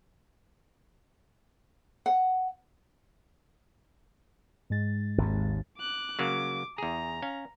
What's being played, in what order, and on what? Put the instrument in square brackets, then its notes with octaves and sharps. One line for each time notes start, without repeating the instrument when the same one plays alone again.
[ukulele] F#5
[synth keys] G#2 G#3 A6
[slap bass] G#1 D#2
[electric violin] D6 F#6
[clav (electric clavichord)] C#3 F#3 A#3 [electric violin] D6
[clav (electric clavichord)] E2 G#4 [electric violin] A#5
[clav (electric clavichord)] C#4 F5